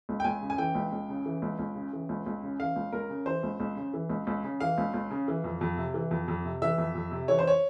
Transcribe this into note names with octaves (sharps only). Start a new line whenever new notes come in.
C#2
G5
C#2 G#5
C#3
G#5
E3 G5
C#2
C#2
C#3
E3
C#2
C#2
C#3
E3
C#2
C#2
C#3
E3 F5
C#2
C#2 A#4
C#3
E3 C5
C#2
C#2
C#3
E3
C#2
C#2
C#3
E3 F5
C#2
C#2
C#3
E3
F2
F2
C3
E3
F2
F2
C3
E3 E5
F2
F2
C3
E3 C#5
C5
C#5